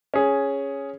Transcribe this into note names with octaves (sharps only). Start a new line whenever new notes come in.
C#4 G#4